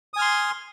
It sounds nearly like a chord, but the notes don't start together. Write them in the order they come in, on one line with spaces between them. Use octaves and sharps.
D#6 G#5 F6 C6